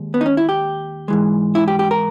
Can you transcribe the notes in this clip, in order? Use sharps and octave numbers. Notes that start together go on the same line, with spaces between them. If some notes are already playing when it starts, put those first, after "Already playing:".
Already playing: D#2 G#3
B3
D#4
C#4
E4
G4
G#2 E3 G#3
E4
G4
G4
A#4